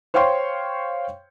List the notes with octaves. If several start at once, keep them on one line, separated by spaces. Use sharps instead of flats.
C5 C#5 F5 G5 C6 C#6